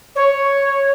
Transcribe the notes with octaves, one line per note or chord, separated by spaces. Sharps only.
C#5